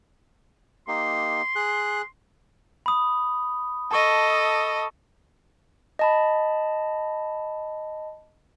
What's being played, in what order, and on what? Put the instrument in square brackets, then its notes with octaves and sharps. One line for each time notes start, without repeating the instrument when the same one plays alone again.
[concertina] A#3 D#4 G4 [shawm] C6
[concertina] G#4 F#6
[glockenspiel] B5 D#6
[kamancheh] A4 D#5 [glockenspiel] A5 C#6
[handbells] D#5 A5 B5